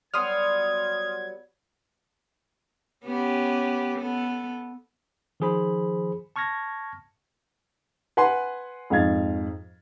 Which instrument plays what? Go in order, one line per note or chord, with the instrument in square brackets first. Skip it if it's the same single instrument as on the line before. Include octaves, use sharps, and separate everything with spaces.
[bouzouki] F#3 G3 B3 [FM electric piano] C6 D#6 F6 [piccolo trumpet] G#6
[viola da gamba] B3 C#4 G4
B3 A4
[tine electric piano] D#3 F3 G#4 C5 B5
A5 C#6 F6 G#6 A#6
[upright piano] B4 F#5 G#5 C6
F2 G#2 F5 G#6 A6